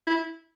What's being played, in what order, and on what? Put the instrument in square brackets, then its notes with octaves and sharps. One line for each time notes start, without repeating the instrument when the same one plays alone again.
[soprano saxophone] E4